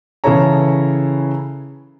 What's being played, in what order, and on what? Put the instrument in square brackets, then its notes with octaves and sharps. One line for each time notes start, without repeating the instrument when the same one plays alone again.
[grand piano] C#3 E3 E4 A4 C#5 A#5